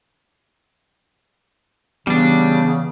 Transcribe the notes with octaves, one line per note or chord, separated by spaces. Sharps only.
C#3 E3 G3 B3 D4